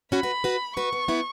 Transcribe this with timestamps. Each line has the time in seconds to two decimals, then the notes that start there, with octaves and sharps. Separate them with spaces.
0.12 C#4 F#4 B5
0.23 F#4 B4
0.44 F#4 B4
0.77 F#4 B4 C#6
0.93 B3
1.08 B3 E4